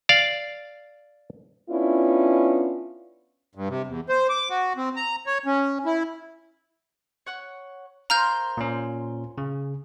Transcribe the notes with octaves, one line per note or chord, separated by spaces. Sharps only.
D5 F5
B3 C#4 D4 E4 F4
G2
C3
E2
C5
D6
F#4
C4
A#5
C#5
C#4
E4
C#5 F#5 C#6
F4 A#4 C5 A#5 F6 G6
A#2 C#4
C#3